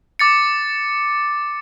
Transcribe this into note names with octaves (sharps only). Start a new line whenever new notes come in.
D6 A6 C#7